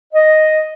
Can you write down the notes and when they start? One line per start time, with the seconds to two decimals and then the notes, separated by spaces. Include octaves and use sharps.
0.13 D#5